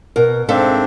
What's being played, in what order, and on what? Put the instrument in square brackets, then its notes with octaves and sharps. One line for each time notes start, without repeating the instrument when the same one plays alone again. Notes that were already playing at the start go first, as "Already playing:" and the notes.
[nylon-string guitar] B2 A#4
[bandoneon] G#2 C4 D4 [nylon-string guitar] A4 E5 F5